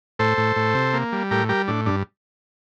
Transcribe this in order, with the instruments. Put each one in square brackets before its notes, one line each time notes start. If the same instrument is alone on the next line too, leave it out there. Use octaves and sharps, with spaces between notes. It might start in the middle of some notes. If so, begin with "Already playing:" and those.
[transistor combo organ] A2 A4 C5
A2
A2
C3
A#3
G3
A2 G4 A#4
G3 G4 A#4
A2 D4
G2 D4